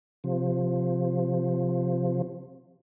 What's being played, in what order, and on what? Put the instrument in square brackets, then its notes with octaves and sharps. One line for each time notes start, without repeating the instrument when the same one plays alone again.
[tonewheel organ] C3 F3